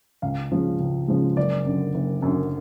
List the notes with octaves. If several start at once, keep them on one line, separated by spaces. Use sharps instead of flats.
C#2 F5
C#3 F3 G#3
C#2
C#3 F3 G#3
F#1 D5
F#2 D3
F#1
F#2
D3